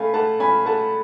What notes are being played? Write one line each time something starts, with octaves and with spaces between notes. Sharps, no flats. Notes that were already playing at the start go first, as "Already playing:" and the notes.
Already playing: A3 C#4 F5 G#5 B5
A3 F#5 A5
C#4 G#5 B5
A3 F#5 A5